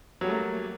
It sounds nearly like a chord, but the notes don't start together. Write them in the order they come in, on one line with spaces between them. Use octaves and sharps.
F#3 G3 A3 A#3